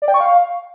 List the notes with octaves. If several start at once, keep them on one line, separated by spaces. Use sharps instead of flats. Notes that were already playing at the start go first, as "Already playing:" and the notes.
D5
G5
C#6
F5